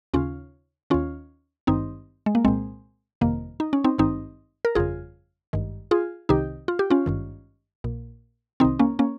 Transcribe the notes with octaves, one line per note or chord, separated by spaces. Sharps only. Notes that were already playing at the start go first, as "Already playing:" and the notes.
D#2 C#3 C#4 F4
D#2 D#3 C#4 F4
G#1 G2 D#3 C4 D#4
G#3
A#3
C2 A#2 G#3 C4
G1 F2 C3 D#3 A#3
D#4
C#4
C4 D#4
G#1 G2 D#3 C4 D#4
A#4
G1 F2 C#3 F4 G#4
G#1 G2 D#3
F4 G#4
C2 C3 D#3 D#4 G4
F4
G4
C#4 F4
G#1 G2 D#3
A#1 A#2
C2 C3 D#3 C4 D#4
A#3 C#4
A#3 C#4